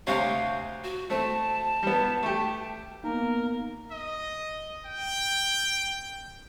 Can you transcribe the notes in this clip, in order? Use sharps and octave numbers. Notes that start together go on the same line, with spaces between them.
D2 C3 C#5 F5
F#4
A3 C4 A5
G3 B3
A3 G4
A#3 B3 D#4 A#4
D#5
G5